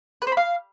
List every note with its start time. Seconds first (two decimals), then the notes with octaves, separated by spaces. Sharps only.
0.22 B4
0.27 C5
0.32 B5
0.37 F5